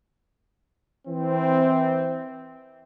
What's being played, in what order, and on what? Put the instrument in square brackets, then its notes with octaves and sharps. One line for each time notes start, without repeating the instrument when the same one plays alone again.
[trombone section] E3 C4